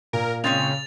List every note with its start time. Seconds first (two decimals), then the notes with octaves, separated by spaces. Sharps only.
0.13 A#2 A#4
0.44 C#3 G#3 C4 C#4 A6 F7